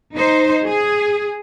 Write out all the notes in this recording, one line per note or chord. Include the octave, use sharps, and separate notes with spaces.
D#4 C5
G#4